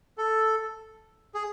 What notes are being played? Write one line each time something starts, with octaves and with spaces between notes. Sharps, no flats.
A4
G#4